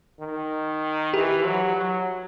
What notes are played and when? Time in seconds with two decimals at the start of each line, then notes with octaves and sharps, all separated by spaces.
0.20 D#3
1.14 E3 G4
1.45 F#3
1.76 F#3